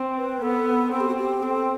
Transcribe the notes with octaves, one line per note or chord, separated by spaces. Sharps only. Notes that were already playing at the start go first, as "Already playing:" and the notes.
Already playing: C4
B4
B3 A4
C4 A4
G4
F#4
G4
C4 A4